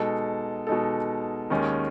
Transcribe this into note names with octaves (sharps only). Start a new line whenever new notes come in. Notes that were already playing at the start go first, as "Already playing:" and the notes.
Already playing: B2 G#3 D#4 A4
B2 G#3 D#4 A4
D#2 D#3 G#3 C#4